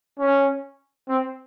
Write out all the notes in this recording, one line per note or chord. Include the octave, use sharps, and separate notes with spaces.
C#4
C4